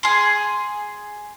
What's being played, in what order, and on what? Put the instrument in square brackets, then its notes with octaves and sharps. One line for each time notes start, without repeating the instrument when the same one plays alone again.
[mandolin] G#4 C6